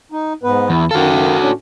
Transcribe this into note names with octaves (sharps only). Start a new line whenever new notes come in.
D#4
G#2 B3 B4
E2 E4
F#2 D#3 F#4 A4 F5
A2 C#4 D4